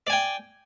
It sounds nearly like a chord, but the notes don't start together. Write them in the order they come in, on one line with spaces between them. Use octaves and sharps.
D5 G#5 G5